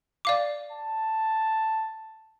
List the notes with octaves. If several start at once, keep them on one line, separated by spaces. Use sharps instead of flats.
D5 F5 D6
A5